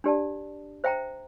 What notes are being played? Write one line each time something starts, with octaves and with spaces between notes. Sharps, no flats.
D4 G4 D5 A5
C5 E5 G5 A#5